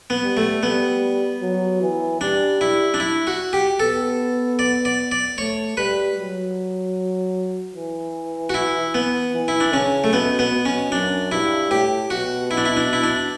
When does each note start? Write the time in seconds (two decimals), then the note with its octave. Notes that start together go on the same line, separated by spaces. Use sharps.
0.10 B3
0.24 G3
0.37 A3
0.63 G3 B3
1.42 F#3
1.82 E3
2.21 G3 D4
2.61 E4
2.94 D4
3.00 E4
3.27 F#4
3.53 G4
3.80 B3 A4
4.59 D5
4.85 D5
5.11 D5
5.38 A3 C#5
5.77 G3 B4
6.18 F#3
7.75 E3
8.50 F#4
8.54 E4
8.94 B3
9.34 E3
9.48 E4
9.60 D4
9.73 C#3 C#4
10.04 A3
10.13 B2 B3
10.39 B3
10.52 B2
10.65 C#4
10.92 F#2 D4
11.32 G2 E4
11.71 A2 G4
12.10 B2 F#4
12.51 E4
12.57 D4
12.65 E4
12.77 D4
12.93 E4
13.04 D4